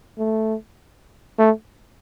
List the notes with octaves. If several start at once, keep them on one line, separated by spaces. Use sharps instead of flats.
A3
A3